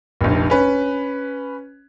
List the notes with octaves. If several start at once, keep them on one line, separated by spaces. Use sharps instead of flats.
F1 A#1
C#4 B4